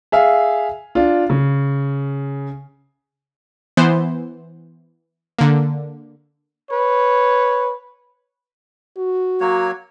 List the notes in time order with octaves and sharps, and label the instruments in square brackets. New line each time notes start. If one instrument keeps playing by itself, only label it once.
[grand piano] G#4 E5 F5
D4 F4
C#3
[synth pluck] E3 B3 C5
D3 A#3
[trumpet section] B4 C#5
[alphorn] F#4
[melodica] F#3 A#3 C#5